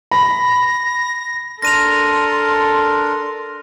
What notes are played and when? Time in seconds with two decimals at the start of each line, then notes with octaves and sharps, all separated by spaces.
0.11 B5 A#6
1.62 D4 A4 A#4 C6 A#6 D#7 F7